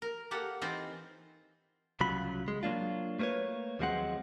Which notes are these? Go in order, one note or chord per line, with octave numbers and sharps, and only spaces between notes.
A#4
A#3 G4 A4 F#5
E3 C4 D#4 F4 C5
C2 C#3 F#3 F4 B5
G#3
F#3 A#3 D4 F4
A3 A#3 A#4 B4 C#5
D#2 F3 F#3 G#3 C4 F#5